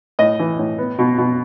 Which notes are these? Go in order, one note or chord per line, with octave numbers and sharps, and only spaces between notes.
A2 D#5
E3
A2
B3
B2
B2